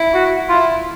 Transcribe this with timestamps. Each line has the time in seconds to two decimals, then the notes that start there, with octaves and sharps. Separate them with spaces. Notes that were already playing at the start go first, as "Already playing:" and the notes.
Already playing: E4
0.14 F#4
0.49 E4 F4